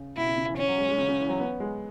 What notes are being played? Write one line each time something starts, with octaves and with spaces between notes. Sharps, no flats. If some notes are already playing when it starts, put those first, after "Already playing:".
Already playing: C#3
B2 E4
C#3
C#3
E3
C#3 C#4
F#3
G#3
G#3
C#3
C#3
E3
F#3
B3
G#3